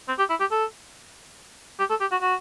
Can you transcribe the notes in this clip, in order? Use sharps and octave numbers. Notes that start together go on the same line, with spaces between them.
C4
G4
E4
G4
A4
G4
A4
G4
F#4
F#4